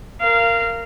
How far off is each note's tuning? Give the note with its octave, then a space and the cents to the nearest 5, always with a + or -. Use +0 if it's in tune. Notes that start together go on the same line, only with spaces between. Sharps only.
A#4 -10 F5 -20